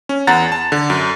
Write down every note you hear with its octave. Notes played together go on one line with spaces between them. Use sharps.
C#4
E2 F#5 A#5 A6
A5
D3
F#2